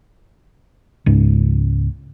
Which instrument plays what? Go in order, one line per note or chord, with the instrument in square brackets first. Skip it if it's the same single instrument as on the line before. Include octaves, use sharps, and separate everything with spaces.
[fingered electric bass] C#2 G#2